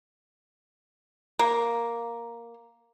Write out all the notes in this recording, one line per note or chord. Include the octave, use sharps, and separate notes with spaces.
A#3